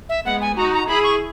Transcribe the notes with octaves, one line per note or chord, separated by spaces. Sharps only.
E5
G#3 B3 F#5
G#5
D#4 F#4 A#5
A#5
E4 G#4 B5
C#6